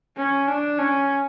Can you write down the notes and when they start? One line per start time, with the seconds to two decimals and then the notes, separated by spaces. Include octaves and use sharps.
0.17 C#4
0.48 D4
0.78 C#4